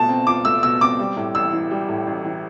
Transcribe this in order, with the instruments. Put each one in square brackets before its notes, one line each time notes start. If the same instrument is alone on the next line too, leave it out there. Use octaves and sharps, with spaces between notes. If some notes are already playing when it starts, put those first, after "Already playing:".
Already playing: [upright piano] B2 A3 F4 [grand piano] A5
[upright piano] C4
[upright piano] F4 [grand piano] D6
[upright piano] A3 [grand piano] E6
[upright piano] B2 [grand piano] E6
[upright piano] C4 [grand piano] D6
[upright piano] G3
A2
[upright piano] A1 [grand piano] E6
[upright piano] E3
G3
A2
A1
E3